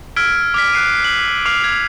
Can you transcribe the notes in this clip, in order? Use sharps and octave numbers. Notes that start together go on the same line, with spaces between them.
E6 F6 G#6 B6 D7
D6 F6 B6
F#6 C7 D#7
F#7
D6 F6 C7 F7
G#6